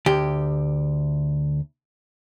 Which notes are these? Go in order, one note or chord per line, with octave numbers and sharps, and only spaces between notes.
D2 G4